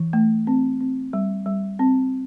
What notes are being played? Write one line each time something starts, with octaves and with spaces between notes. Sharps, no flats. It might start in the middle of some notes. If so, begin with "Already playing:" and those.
Already playing: E3
A3
C4
C4
G3
G3
C4